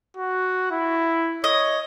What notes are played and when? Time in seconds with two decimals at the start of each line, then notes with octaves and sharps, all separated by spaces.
0.16 F#4
0.71 E4
1.44 C#5 D#5